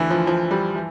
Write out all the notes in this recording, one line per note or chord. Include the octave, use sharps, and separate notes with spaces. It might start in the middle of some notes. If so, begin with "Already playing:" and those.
Already playing: D2 D3 E3
F3
F3
G3
E3